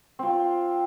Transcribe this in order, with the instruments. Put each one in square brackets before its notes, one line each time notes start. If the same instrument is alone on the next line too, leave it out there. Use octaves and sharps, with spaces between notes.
[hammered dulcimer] C4 F4